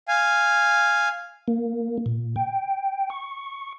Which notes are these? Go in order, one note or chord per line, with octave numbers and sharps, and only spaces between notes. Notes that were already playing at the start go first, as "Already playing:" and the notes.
F5 G#5
A#3
A#2
G5
C#6